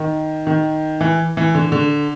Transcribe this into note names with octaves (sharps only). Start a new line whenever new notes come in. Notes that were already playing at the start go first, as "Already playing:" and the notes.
Already playing: D#3
D#3
E3
E3
D3
D3